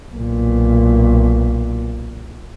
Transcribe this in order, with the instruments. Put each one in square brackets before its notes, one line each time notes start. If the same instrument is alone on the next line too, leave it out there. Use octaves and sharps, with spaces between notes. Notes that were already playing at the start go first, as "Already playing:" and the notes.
[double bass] B1 A#2